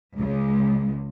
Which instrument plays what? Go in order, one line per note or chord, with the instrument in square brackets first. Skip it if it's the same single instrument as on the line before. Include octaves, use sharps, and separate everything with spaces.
[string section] C#2